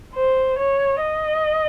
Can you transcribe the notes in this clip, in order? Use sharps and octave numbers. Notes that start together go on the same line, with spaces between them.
C5
C#5
D#5